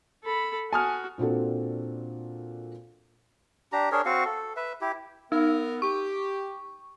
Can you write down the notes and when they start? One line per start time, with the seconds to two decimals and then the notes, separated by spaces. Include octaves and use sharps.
0.24 A4 B5
0.73 F#4 G#5 A5 D#6 F6
1.18 A#2 C4 D4 F#4 A4
3.72 D4 G4 A#5
3.92 D4 G#4 A#4 C#5
4.05 C4 F#4 F5 C#6
4.25 A4
4.57 B4 E5
4.81 E4 G4
5.32 B3 D#4 A#4
5.82 G4 C#6